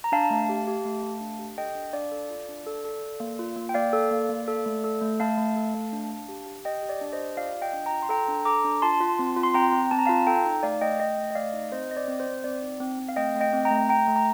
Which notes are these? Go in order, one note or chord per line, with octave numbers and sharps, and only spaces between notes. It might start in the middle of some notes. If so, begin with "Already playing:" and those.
A#5
D4 F5 A5
A3
G4
G4
A3
A3
D4
G4
A4 D#5 G5
D4
D4 D5 F5
A4
F4
D4
A4
A4
A4
A#3
F4
A#3
G5
A#3 D5 F5
A4
A#3
A#3
A4
A3
A4
A3
A3 F5 A5
A3
A4
A3
D4
D4
G4
G4
G4 D#5 G5
G4
D5
D4
C5 D#5
G4
F4 D5 F5
F4
D#5 G5
D4
G5 A#5
F4
C6
A4 G5 A#5
D4
A4 A#5 D6
D4
F4 A5 C6
F4
C4
F4
C6
C4 G5 A#5
C4
C4 A5
A#5
F4 F5 A5
A4 G5 A#5
D#4
A3 D5 F5
A3 D#5 G5
A3 D#5 G5
A3
D#5
A3 D5 F5
D#4
C4 C5 D#5
C4 D#5
D5
C4
C5
C4
C4 D5
D#4
C4
C4
F5
A3 D#5 G5
A3
D#5 G5
C4
G5 A#5
A3
A3 G5 A#5
A3
A#5